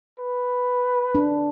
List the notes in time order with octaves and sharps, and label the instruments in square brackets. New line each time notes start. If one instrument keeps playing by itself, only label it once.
[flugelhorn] B4
[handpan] D4